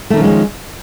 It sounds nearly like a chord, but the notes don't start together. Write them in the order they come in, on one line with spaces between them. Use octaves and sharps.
A3 D#3 C#4 F3 G#3